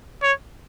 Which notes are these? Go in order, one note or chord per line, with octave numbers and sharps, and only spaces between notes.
C#5